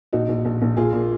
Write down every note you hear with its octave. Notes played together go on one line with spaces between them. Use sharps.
A#1 D#4 F#4
A#1
A#1
A#1
A#1 F4 G#4
A#2